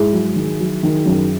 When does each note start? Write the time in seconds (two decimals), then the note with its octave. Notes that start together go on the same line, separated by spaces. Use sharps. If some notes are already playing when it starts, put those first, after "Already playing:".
Already playing: G#2 E4 G#4
0.12 F#3
0.35 D#3
0.59 F#3
0.83 D#3
1.06 F#2